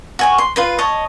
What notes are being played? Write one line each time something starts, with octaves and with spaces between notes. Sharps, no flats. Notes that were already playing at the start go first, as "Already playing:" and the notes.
F#4 G#5 C#6
C6
F4 B4 C6
C#5 D#5 A5